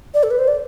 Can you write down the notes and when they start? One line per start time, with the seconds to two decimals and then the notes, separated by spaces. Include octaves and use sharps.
0.14 D5
0.23 A4
0.30 B4
0.39 C5
0.48 D5